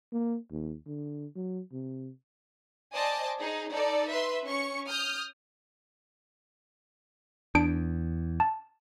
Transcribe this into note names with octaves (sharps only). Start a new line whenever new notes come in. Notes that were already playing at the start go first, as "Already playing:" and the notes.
A#3
D#2
D3
F#3
C3
C5 D5 D#5 G#5 A5 D6
D#4 G#4
D#4 A4 D5
B4 E5 C6
C#4 C#6 C#7
D#6 F6 G6
E2 D4 D7
A5